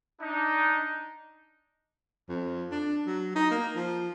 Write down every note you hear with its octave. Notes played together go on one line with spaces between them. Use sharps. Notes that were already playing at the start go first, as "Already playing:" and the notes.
D4 D#4
F2
D4
F#3
D#4
A#3
F3